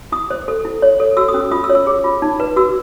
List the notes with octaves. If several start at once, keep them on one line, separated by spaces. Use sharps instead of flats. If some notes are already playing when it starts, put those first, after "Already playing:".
E4 D#6
C5
A4
E4
C#5
A4
F#4 E6
D#6
C#4
E6
F4 D#6
E6
C#5
E6
G#4
F4
D#4
B4
F#4 E6